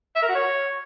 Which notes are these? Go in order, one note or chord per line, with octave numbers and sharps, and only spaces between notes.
E5
A#4
F#4
C#5